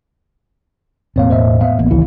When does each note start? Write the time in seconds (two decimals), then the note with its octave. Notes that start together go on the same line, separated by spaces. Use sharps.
1.16 E1 A2 A#3 C4 C#5 F5
1.30 C5 D#5 E5
1.61 B3 E5 F5
1.79 A1 A#3 B3
1.91 G#1 C#2 D#3 E3 E4